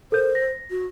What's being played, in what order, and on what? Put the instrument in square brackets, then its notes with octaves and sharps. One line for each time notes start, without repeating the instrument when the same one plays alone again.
[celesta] A4 A#4 G6 [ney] C5
[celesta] A#6
[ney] F#4